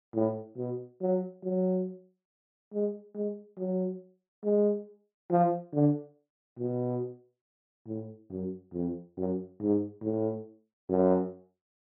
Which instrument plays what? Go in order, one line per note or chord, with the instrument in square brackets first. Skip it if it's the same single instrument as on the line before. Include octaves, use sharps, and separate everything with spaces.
[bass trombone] A2
B2
F#3
F#3
G#3
G#3
F#3
G#3
F3
D3
B2
A2
F#2
F2
F#2
G#2
A2
F#2